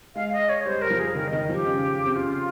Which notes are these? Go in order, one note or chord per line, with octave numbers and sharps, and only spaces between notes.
G#3 F5
D#5
C#5
G3 C5
G3 A#4
F3
G#4
D#3 A#4
D#3 D#5
F3
G4
C#3
C3
C#3 F4